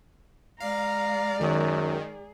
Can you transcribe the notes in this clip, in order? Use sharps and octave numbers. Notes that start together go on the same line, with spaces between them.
G#3 D5 F5 A#5
F#2 D#3 G#4